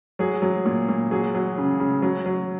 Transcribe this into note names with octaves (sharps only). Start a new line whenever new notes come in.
F#3 G#4
F#3
A#2
A#2
F#3 G#4
F#3
C#3
C#3
F#3
F#3